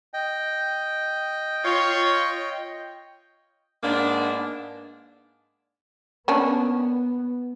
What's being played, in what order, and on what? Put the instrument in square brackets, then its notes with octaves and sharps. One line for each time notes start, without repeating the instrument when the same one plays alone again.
[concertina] D#5 G5
[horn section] F4 C#5
[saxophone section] G#2 A#3 B3 D4
[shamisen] A#3 C#4 D4 [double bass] B3